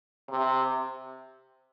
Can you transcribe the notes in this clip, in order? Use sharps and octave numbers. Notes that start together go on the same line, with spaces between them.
C3